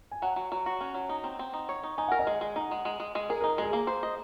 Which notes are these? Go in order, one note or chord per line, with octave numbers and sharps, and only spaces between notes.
G#5
F#3 F#5
F#3
F#3
F#4
C#4
F#3
D#4
C4
C4
D#4
C#5
D#4
D#4 G#5
A#4 F#5
D#5
G#3
G#3
D#4
G#3
G#3
G#3
G#3
G#4 A#4
D#4 A#4
G#3 G#4
A#3
C5
D#5